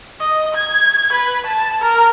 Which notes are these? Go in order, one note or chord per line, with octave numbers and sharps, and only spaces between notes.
D#5
G#6
B4
A5
A#4